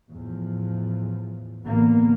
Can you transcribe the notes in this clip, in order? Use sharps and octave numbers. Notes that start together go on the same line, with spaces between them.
E2 A2 F3
A1 D3 E3 A#3 B3